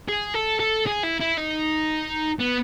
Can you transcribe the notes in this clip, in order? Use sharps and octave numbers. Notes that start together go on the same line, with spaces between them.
G#4
A4
A4
G#4
E4
E4
D#4
B3